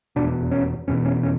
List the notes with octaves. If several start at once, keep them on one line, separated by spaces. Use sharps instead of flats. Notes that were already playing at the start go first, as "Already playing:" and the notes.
F1 E2 B2 D4
C#4
F1 E2 B2 C#4
C#4
C#4